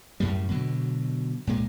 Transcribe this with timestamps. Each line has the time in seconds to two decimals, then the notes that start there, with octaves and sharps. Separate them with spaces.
0.20 F#2 A2 C#3 G3
0.51 B2 D3 F#3
1.47 C#2 A#2 G#3